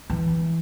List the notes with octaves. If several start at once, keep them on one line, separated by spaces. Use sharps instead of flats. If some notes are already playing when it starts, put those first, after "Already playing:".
E3